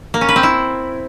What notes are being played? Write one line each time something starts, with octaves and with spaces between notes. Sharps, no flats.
A#3
C#4
B4
C4
E4